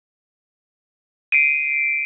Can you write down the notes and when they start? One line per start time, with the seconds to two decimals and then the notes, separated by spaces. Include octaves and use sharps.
1.32 C7 D7 D#7